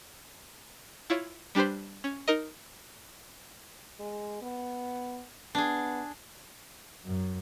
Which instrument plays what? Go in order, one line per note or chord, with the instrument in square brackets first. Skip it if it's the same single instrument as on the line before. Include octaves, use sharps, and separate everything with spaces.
[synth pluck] E4 F4 C#5
G3 D4 G4 B4 C5
C#4
D#4 A#4 D#5
[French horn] G#3
B3
[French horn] B3 [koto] D4 G#4
[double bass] F#2